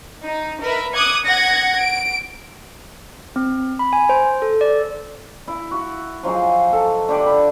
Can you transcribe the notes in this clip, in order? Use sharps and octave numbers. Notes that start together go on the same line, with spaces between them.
D#4
A#4 B4 E5
D6 D#6 F#6 G#6 C#7
F#5 G#6 A#6 C#7
D7
C4
B5
G#5
C5
A4
D5
E4
F#4
F3 F#3 D#4 G#4
A4
D3 G4 F#5 D6
B5